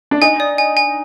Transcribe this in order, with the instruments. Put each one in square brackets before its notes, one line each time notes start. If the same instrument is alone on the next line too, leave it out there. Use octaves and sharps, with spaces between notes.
[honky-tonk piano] D4
[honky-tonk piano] D#4 [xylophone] G#5
[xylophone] D5
G#5
G#5